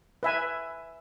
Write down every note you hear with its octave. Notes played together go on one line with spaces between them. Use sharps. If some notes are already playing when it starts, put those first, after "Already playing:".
B4 E5 G#5